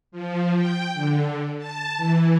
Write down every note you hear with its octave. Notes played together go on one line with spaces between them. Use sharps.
F3
G5
D3
A5
E3